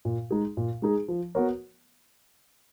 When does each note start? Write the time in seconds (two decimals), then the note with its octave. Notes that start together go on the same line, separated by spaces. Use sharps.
0.05 A#2
0.31 G#3 D#4 G#4
0.57 A#2
0.82 G#3 D#4 G#4
1.08 F3
1.35 B3 F#4 A#4 C#5